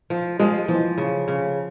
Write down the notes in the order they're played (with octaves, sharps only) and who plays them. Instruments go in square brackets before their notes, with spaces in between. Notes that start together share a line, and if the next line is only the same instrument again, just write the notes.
[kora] F3
[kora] F3 [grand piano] G#3
[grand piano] E3 [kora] F3
[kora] C#3
C#3